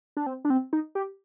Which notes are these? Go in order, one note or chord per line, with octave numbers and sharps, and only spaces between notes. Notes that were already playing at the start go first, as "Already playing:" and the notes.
D4
C4
D4
C4
D#4
G4